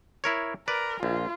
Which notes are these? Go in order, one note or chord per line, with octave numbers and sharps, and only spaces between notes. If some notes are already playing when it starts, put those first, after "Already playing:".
E4 A#4 C#5
A#4 B4 D5
A#1 F4